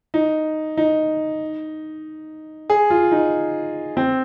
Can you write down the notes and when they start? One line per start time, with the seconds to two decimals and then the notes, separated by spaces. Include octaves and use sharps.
0.14 D#4
0.77 D#4
2.70 G#4
2.90 F4
3.12 D#4
3.97 C4